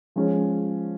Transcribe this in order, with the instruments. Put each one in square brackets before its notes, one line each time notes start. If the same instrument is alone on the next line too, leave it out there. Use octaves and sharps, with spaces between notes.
[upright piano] F3 G#3 C#4